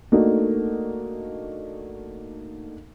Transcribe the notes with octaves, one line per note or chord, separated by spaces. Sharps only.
A3 A#3 D4 D#4 F#4